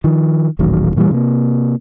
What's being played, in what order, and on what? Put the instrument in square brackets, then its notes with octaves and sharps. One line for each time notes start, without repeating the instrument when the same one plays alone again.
[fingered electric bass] D#3 F3
D#1 A1 D#3 F#3
A#2 E3 F3 G3
C3 A#3